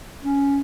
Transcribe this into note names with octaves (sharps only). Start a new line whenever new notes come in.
C#4